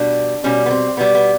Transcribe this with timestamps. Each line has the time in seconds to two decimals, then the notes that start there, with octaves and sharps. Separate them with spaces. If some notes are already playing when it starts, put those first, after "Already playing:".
Already playing: B2 G3 D4
0.44 B2 G3 C#4
0.66 B3
0.70 C4
0.97 B2 G3 B3
1.15 B3